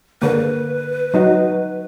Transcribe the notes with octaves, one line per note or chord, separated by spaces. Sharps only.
D3 A#3 B4
F#3 D#4 F#4